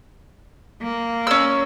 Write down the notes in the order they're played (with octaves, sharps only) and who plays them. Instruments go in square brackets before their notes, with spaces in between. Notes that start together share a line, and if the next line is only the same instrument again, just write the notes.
[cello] A#3
[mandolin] C#4 E6